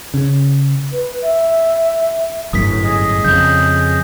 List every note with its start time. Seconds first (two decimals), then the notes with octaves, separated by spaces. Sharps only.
0.14 C#3
0.92 B4
1.23 E5
2.53 G1 F#2 A2 D#6 B6
2.84 G#4 D#5
3.24 F2 C#3 G6